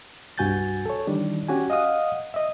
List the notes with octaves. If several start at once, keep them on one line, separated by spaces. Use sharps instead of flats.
C2 G2 F#4 G#5 G6 A6
A4 C#5
D#3 E3 G3 D4
C#4 F#4 G4 G#5
D#5 F5 F#5 D#6
D#5 E5